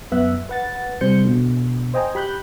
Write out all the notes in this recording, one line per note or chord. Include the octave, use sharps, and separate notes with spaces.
F#2 B3 E5 F#6
B4 F#5 A6
C3 G3 C5 G6 C#7
B2 D3
C5 D#5 G5 G#5 A#5
G4 B5 F#6 G6